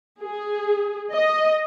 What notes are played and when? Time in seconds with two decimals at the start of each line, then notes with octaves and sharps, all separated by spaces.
0.22 G#4
1.13 D#5